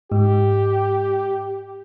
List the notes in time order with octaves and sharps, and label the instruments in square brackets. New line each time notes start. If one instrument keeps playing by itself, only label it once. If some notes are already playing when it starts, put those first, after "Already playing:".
[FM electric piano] G#2 [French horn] G4